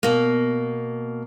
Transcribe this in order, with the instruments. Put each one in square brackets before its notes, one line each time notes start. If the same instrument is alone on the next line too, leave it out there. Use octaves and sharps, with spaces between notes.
[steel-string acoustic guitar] B2 A#3